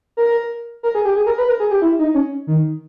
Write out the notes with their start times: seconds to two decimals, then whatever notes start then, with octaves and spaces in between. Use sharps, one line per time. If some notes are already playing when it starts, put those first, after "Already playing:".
0.17 A#4
0.83 A#4
0.95 G#4
1.05 G4
1.16 G#4
1.26 A#4
1.38 B4
1.49 A#4
1.60 G#4
1.71 G4
1.82 E4
1.99 D#4
2.14 C#4
2.47 D#3